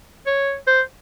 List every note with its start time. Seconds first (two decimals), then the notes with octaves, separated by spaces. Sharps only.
0.27 C#5
0.67 C5